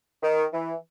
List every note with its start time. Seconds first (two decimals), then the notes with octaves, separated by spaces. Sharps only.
0.23 D#3
0.53 E3